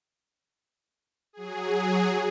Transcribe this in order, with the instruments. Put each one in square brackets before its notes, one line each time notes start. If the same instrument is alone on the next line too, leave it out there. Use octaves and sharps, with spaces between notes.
[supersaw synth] F#3 G#4